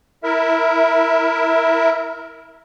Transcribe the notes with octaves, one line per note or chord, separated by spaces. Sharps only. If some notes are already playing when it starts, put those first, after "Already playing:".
E4 A#4 E5